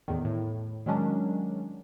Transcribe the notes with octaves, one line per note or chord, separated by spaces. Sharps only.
E2 A2 D#3
A2
D#3 F#3 G#3 C#4 D4